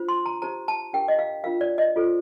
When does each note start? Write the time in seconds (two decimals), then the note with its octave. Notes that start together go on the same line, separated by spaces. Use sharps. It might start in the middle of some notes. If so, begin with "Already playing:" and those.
Already playing: D4 F4 C5
0.09 C6
0.26 A#5
0.42 D#4 G4 C5 A#5
0.68 A5
0.93 D4 G4 A#4 G5
1.08 D#5
1.19 F5
1.44 D4 F4 A#4 F5
1.61 D5
1.78 D#5
1.96 F4 A4 C5